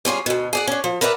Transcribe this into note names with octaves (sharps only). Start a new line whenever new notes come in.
G3 C#4 F4 G#4
D2 B2
G#4 D5 F#5
C#4 D4
F3
A#4 B4 D5 E5 F#5